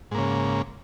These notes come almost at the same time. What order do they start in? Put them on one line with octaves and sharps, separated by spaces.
G#2 A#3 C#3